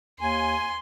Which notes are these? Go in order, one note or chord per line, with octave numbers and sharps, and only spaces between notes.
D#2 G#5 C6